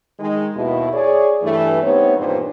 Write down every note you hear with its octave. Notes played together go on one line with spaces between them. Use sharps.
D#3 G#3 D#4
D#2 B2 E4
G#4 C#5 D5
G2 E3 A3
G3 B3 C4 D#4 C#5
E2 G2 A#2 D#3 D4 C5